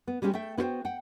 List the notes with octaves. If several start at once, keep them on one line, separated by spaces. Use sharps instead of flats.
B3
G3 G#3 C#4 E4 G4
A3 E5 G5
B3 E4 F#4 A4 C5 G5
F#5 G5